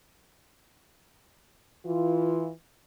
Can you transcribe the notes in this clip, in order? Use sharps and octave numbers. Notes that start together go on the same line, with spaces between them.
E3 F4